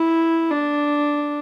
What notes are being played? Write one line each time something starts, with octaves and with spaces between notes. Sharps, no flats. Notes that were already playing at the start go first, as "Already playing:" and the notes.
Already playing: E4
D4